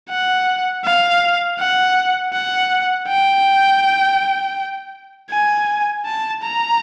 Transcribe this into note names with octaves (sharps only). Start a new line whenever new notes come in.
F#5
F5
F#5
F#5
G5
G#5
A5
A#5